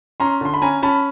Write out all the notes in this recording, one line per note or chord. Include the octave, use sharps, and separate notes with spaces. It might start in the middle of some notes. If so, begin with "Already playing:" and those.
C#4 A#5 C6
D3 C6
B5
C#4 G#5 A#5
C#4 A5 B5